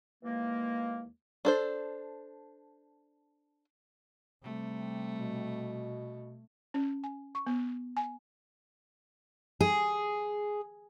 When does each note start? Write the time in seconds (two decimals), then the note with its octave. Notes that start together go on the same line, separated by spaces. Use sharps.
0.23 D#2 E3 G#3 A#3
1.45 D4 A4 C5
4.43 C3 G3 A3
5.11 B2
6.74 C#4
7.04 G#5
7.35 C#6
7.47 B3
7.97 G#5
9.60 G#4